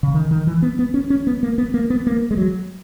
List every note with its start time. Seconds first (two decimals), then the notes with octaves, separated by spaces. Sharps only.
0.03 C#3
0.14 D#3
0.31 D#3
0.47 E3
0.62 B3
0.79 B3
0.94 C#4
1.10 C#4
1.27 B3
1.43 A#3
1.58 B3
1.74 A#3
1.90 B3
2.07 A#3
2.31 G#3
2.37 F#3